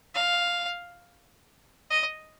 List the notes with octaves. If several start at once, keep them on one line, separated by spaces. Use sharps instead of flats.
F5
D#5